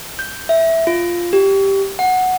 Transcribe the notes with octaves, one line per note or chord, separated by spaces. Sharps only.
G6
E5
F4
G4
F#5